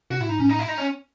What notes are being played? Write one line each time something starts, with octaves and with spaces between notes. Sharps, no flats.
C3 F#4
A2 E4
G#2 D#4
A2 C#4
D#4
E4
D#4
C#4